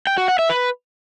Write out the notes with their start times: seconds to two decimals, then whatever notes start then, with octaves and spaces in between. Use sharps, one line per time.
0.07 G5
0.18 F#4
0.28 F#5
0.39 E5
0.49 B4